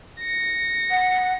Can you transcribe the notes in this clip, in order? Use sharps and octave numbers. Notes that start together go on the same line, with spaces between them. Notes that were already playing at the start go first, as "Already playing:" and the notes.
A#6 C#7
F#5